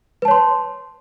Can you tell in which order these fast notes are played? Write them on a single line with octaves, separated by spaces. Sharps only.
B4 A5 C#5 C6